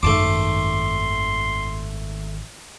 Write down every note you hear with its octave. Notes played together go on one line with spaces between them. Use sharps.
G#1 F#2 D#3 A3 A5 C6 D6